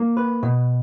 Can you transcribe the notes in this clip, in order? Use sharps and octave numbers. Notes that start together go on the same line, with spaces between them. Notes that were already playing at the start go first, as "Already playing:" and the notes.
Already playing: A#3
B4
B2